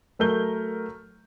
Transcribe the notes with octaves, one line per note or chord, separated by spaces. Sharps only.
F#3 A3 A#4 G6 G7